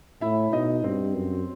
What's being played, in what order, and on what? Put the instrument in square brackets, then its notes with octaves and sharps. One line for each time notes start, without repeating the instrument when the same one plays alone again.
[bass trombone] A2 [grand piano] E4 E5
[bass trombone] B2 [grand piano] D#4 D#5
[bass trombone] G2 [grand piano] C4 C5
[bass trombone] F#2